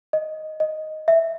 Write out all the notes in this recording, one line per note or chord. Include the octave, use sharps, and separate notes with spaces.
D#5
D#5
E5